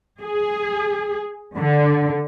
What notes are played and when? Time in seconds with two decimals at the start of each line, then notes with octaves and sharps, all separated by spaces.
0.23 G#4
1.57 D3